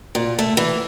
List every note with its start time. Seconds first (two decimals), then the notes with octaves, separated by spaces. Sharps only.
0.15 A#2
0.39 A3
0.57 E3